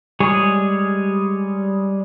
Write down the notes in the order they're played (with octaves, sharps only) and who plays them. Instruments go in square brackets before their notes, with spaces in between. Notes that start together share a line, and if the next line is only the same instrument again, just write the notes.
[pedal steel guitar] G3 G#3 G#4 C#5